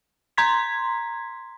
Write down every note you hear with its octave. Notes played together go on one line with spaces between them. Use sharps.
A#5 C6 G#6 B6